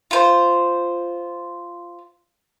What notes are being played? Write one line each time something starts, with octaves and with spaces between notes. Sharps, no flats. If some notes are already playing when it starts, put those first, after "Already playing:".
F4 C5